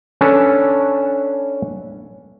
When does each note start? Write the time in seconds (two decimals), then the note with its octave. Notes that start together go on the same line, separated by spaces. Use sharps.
0.21 C#4 D4 A4 B4